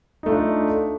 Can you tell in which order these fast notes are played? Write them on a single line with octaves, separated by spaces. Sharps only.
D#4 A3 F4 D4